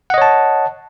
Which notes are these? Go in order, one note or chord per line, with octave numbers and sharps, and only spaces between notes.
C#5 D#5 F#5 A5